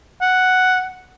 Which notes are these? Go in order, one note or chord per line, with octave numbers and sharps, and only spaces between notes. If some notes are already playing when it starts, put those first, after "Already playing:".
F#5